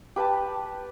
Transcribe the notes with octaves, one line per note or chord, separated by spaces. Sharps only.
G4 B4 G5 A5